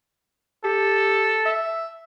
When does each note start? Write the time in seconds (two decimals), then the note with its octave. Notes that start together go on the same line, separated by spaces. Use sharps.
0.64 G4 A4
1.45 E5